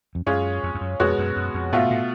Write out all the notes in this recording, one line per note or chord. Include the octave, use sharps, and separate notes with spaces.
F2
F#2 G#3 C#4 F4 G#4 C#5
F2
F2
F#2
F2 B2 G#3 B3 F#4 C#5
F#2
F#2
F2
G#2 B2 A3 F4
A2